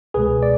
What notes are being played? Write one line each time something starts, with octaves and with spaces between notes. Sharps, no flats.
C#2 B2 G#3 G#4 B4
D5